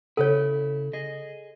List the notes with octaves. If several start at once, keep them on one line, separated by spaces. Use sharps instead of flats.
C#3 E4 A4 C#5
G#4 D#5